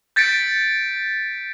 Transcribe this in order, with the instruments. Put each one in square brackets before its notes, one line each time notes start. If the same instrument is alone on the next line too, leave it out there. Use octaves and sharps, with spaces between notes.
[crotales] G6 A6 B6 C#7 D7